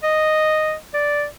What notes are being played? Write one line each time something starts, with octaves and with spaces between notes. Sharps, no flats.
D#5
D5